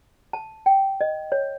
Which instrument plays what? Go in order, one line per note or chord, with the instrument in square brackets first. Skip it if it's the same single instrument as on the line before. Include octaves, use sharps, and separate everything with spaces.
[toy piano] A5
G5
D#5
C#5